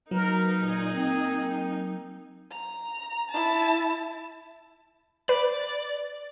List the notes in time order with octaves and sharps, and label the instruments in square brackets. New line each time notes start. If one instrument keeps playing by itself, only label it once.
[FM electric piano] F#3 [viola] A#3 D#4 [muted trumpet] A#4 [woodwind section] B4
[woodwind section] A#2 [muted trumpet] G#4
[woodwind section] C4
[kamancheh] A#5
E4 A5
[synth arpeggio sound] B4 [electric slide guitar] D5